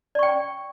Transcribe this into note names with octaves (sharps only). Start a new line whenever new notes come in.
D5 G5 C#6